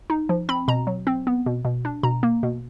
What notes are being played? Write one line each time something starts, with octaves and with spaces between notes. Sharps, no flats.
D#4
F3
C4 B5
B2 A#5
F#3
C4
B3
B2
B2
D4
B2 A#5
A#3
B2